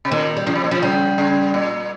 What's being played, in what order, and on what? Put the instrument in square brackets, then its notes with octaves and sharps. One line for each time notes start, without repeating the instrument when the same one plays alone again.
[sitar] C3
[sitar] A#2 [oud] D#3
[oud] G3
[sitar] C#3 [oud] F3
[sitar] C3
A#2
[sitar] C3 [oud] F3
[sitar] C#3 [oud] G3
[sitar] C#3
A#2